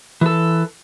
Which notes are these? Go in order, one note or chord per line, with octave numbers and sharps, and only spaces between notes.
E3 A4